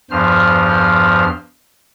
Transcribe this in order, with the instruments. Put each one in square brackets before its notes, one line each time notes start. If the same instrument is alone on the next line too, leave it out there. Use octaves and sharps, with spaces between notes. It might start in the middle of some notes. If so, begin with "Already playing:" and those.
[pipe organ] E2 G2 F3 C5 F6